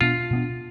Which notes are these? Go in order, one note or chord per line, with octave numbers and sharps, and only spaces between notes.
B2 B3 D4 F4
B2 B3 D4